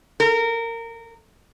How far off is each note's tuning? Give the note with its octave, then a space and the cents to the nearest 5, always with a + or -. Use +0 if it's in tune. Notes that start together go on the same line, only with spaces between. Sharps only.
A#4 -20